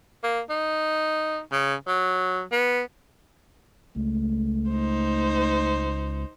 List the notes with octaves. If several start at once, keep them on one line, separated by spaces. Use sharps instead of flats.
A#3
D#4
C#3
F#3
B3
C#2 A3
D#4 C5